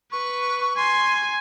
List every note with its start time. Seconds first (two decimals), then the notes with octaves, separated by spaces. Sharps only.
0.12 B4 C#6
0.76 G#5 C6